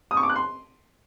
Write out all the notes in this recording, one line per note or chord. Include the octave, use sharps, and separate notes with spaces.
D#6
C#6
D6
F#6
C6